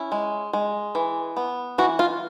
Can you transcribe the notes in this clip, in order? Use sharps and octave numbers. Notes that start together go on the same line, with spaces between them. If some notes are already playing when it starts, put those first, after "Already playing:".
Already playing: C#4 E4
G#3
G#3
E3
B3
E3 F#4
F4